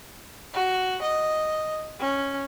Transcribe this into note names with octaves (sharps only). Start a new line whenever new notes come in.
F#4
D#5
C#4